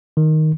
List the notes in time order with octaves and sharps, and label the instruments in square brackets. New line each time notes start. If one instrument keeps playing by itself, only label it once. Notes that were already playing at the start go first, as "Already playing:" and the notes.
[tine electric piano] D#3